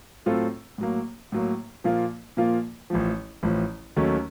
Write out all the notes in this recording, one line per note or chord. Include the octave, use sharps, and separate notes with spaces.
A2 F#3 C4 F4 A4
A2 F#3 A#3
A2 F#3 A#3
A#2 F3 A#3 F4
A#2 F3 A#3 F4
A1 A2 F3
A1 A2 F3
D#2 D#3 F#3 A3 C#4